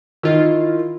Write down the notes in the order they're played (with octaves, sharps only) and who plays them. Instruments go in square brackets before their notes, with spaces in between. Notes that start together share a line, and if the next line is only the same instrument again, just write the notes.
[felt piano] D#3 [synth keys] E4 F4